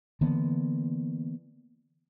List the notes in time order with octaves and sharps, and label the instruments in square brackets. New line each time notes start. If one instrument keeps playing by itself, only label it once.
[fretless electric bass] D3 E3 A#3 B3